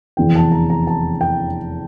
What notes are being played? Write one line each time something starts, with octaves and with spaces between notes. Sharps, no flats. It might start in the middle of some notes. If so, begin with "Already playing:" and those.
F1 E2 E3 G5
A5
A#5
A#5
A5
G5